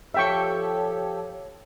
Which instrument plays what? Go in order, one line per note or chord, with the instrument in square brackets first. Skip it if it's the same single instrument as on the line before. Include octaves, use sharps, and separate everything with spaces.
[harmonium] F3 G4 A4 [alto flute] C#5 [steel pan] E5 G5 C#6